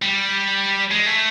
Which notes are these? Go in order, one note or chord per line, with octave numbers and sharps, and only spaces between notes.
G3
G#3
A3